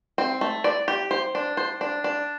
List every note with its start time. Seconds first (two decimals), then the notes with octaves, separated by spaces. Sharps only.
0.18 C4
0.41 A3
0.64 D5
0.88 G4
1.11 C5
1.35 D4
1.57 C5
1.81 D4
2.04 D4